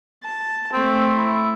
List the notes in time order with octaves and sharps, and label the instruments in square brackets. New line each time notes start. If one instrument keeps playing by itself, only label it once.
[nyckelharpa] A5
[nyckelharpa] A3 [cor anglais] C4
[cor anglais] E4